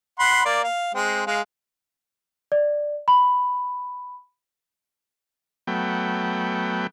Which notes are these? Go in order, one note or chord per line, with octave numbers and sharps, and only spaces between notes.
F#5 B5 C6
A#3 D5
F5
G#3 C4
G#3 F5
D5
B5
F#3 A3 B3 G5